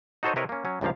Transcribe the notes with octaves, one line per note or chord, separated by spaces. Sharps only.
D#4 F#4 A4 C5 C#5 D#5
C3 E4 A#4 B4 C#5 D#5
A#3 C#4
F#3 C#4
C#2 G2 A#2 F3 A#3 F5